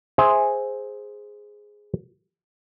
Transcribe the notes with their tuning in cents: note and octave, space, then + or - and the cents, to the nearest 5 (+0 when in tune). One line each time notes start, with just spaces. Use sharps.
G#4 +0 C5 +0 E5 -15